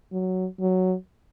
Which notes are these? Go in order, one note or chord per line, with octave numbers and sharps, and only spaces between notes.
F#3
F#3